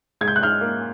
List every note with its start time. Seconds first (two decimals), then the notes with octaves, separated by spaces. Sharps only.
0.21 G#2 G#6
0.28 G6
0.36 F#6
0.41 G#2 F6 G6
0.61 A#3